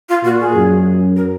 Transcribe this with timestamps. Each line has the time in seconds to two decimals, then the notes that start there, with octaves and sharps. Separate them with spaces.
0.09 F4
0.24 A#2 F#4
0.40 G#4
0.55 F#2
1.16 A#4